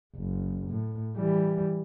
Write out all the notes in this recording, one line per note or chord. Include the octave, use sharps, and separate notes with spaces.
F#1
A2
E3 G3